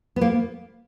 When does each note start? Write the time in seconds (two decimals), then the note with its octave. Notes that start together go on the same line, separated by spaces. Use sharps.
0.16 B3
0.21 A#3